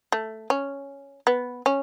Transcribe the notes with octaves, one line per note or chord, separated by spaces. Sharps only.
A3
C#4
B3
C#4